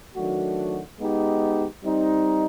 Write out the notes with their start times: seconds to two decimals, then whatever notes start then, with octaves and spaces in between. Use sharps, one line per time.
0.15 D#3 F#3 A3 D4 F#4
0.98 G#3 B3 D#4 G4
1.83 G3 C4 D#4